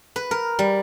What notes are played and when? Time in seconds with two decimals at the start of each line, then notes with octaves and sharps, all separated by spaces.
0.16 B4
0.31 A#4
0.59 G3